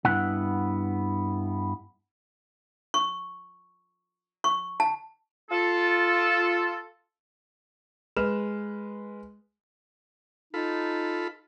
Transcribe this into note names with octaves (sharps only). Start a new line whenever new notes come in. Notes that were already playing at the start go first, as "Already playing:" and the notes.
G2 B3 E4 F#5
C#6
C#6
A5
F4 A4
G#3 B4 F6 E7
D#4 F4 A4 B5